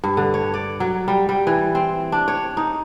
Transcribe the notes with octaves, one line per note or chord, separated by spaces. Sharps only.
G2
D3
C#5
D5
F#3
G3
G3
E3
C4
D4
C#5
D#4